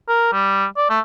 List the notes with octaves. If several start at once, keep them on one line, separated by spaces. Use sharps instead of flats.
A#4
G3
D5
A3